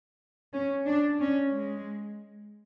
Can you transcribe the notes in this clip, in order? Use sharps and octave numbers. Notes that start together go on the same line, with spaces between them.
C#4
D4
C#4
G#3